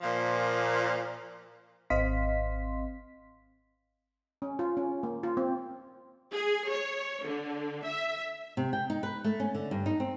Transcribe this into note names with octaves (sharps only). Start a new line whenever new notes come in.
A#2 F3
G#1 C4 D#5 F5 C6 B6
C#4
F4
C#4
A#3
F4
C4
G#4
C#5
D3
E5
C3
G5
D#4
B4
A3
C#4
D3
G2
D#4
C4